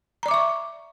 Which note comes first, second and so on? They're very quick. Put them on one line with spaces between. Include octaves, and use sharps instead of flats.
A#5 D5 D6 E5 C#6